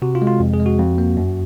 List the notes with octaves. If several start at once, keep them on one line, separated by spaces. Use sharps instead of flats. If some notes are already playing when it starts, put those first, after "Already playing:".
C3 F#4
F4
G#3
F4
F2
G#4
G#3
F#4
F2
A#3
F#2